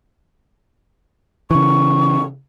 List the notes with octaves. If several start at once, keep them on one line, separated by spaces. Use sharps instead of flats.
C#3 E3 C#6